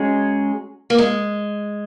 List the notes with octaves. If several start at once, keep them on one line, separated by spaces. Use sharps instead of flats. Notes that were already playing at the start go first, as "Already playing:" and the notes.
Already playing: F#3 G#3 C#4 G#4 C#5
A#3
G#3